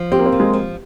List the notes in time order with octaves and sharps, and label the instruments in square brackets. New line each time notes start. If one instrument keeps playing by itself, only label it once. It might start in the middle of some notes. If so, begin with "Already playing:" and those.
Already playing: [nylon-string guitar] F3
[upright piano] C4 [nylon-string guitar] G4
[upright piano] A#3
C4
[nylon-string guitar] F3
[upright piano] G#3
[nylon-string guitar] F3